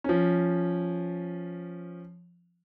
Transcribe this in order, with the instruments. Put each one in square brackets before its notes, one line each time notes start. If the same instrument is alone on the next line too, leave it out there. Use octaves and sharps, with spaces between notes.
[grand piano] F3 C#4